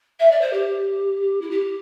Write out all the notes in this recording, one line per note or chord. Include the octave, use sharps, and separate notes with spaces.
E5
D5
C5
G4
E4
G4